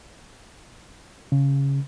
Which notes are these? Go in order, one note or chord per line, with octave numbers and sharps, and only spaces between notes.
C#3